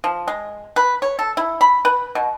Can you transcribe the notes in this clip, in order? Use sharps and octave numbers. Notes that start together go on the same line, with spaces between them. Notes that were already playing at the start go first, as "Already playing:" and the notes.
F3
G#3
B4
C#5
A4
E4
B5
B4
B2